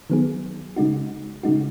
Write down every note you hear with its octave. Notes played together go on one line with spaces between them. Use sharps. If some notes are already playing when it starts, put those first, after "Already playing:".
D#3 F#3 B3 G#4
C#3 G#3 D#4 F#4
C#3 G#3 D#4 F#4